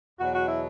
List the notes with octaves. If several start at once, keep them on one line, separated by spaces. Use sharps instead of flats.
E2 B2 F#3 F#4
F#4
E4